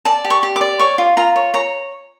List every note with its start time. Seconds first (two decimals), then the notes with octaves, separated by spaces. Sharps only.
0.05 D5 A5
0.25 G4
0.30 C#6
0.43 G4
0.56 D6
0.61 D5
0.79 C#5 C#6
0.98 F4
1.17 F4 A#5
1.36 C#5
1.54 C#5 A#5